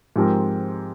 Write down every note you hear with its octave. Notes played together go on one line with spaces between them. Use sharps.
G#2 F3 C4 G4 A#4